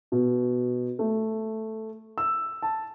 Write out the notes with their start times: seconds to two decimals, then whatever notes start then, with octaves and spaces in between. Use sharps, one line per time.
0.12 B2
0.99 A3
2.18 E6
2.62 A5